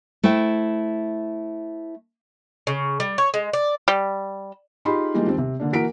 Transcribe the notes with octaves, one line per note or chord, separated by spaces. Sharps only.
A3 E4 C5 E5 G5
C#3
G3
C#5
G#3
D5
G3
D#4 F4 G4 G#4 B5 C6
E3 G3 G#3 A#3 D#4 F4
D#2 G3 C4
C3
D3 A#3 D4
E3 A#3 F#4 A#4 B6 D7